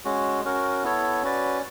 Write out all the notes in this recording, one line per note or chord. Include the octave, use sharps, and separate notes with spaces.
G#3 C#4 F#4
C#4 F#4 A#4
B3 E4 A4 C#5
C#4 F#4 B4 D5